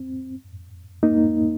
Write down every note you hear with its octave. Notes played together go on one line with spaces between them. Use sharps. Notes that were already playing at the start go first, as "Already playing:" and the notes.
Already playing: C4
A#3 D#4